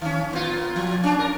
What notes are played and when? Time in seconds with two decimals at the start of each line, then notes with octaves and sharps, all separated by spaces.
0.01 D#3 C#4
0.31 A#2 B3 F4
0.76 F3
1.04 C#4 D4
1.19 A#4